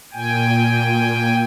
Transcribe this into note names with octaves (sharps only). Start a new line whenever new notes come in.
A#2 G5 G#5